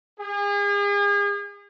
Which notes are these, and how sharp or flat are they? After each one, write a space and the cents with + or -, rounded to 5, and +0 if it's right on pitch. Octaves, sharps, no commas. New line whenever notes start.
G#4 -40